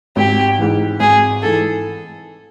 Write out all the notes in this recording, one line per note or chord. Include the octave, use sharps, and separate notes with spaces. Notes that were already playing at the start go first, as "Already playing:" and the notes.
G#1 G4
G#2 E3
G#1 G#4
G#2 E3 A4